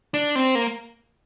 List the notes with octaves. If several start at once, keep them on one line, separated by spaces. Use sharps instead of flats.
D4
C4
A#3